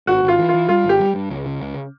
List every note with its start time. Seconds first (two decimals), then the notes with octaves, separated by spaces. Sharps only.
0.07 G#1 F#4
0.23 G#1
0.28 F4
0.39 E3
0.49 F4
0.54 E3
0.69 G3 F4
0.84 G#1 G4
1.00 G3
1.15 G2
1.30 C#2
1.46 C#3
1.61 C#2